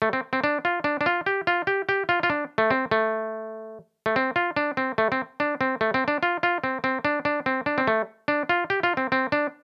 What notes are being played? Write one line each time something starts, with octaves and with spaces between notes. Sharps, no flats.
A3
C4
C4
D4
F4
D4
D4
F4
G4
F4
G4
G4
F4
F4
D4
A3
C4
A3
A3
C4
F4
D4
C4
A3
C4
D4
C4
A3
C4
D4
F4
F4
C4
C4
D4
D4
C4
D4
C4
A3
D4
F4
G4
F4
C4
C4
D4